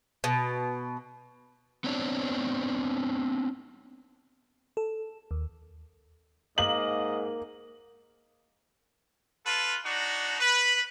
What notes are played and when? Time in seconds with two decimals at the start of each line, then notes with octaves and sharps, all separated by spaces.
0.24 B2
1.84 B3 C4 D4 C#5
4.77 A4
5.31 D#2
6.58 G#2 A#3 D#5 F#7
9.45 F4 A4 B4
9.84 D4 D#4 F#4
10.40 B4